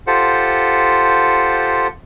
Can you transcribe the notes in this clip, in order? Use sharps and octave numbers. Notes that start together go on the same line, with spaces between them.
F4 G4 A4 C5 F#5